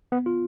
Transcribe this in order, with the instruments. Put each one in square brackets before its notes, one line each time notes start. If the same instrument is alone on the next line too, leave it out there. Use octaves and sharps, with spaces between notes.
[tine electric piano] B3
F4